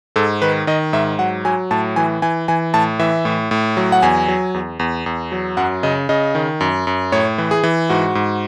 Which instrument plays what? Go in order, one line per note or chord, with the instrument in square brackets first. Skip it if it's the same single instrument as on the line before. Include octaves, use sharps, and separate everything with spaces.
[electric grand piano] G#2 A4
D#3 B4
D#3 D#5
G#2 E5
F#3 F#5
F#3 G#5
A2 A5
E3 G#5
E3 G#5
E3 G#5
A2 A5
E3 E5
A2
A2
F#3
F#5
E2 G#5
F#3
E2
E2
E2
F#3
F#2 F#5
C#3 D#5
C#3 D#5
D#3
F#2
F#2
A2 C#5
E3
G#4
E3
G#2 F#4
G#2